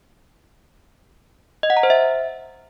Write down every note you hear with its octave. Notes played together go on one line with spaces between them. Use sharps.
D#5
F#5
A#5
C5
E5